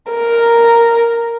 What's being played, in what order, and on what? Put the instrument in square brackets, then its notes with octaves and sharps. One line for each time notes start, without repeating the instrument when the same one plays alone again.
[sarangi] A#4